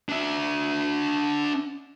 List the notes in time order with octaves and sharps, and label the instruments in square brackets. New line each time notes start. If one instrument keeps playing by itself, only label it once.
[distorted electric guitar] D4 E5